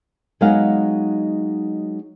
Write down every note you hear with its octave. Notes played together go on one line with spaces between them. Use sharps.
F#3 G#3 B3 D#4 F5 F#5